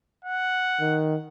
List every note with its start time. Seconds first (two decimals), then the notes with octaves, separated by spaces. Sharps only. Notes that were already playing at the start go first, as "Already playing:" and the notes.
0.25 F#5
0.80 D#3